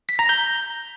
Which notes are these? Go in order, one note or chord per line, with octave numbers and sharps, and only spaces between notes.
B6
A#5
G6